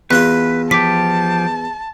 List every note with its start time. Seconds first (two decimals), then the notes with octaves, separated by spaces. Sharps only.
0.11 E2 F4 B4 C6 F#6
0.71 F3 G4 A5 D6 B6